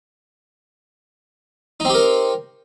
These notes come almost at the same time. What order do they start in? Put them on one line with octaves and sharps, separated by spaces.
D#4 C4 G4 A#4